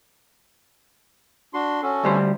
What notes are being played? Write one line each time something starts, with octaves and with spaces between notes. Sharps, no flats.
D4 F#4 C6
C#4 F#4 A4
D2 G3 C5